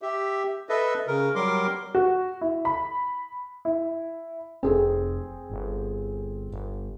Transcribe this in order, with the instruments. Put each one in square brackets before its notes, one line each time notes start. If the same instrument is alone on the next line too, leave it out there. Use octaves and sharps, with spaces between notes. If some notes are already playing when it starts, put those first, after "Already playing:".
[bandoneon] G4 E5
A4 B4 D#5 E5
C#3 A#4
F#3 G3 A#4 C6 D6
[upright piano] F#4
E4
B5
E4
[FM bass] F1 [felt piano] C4 G#4 A4
[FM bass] G1
G1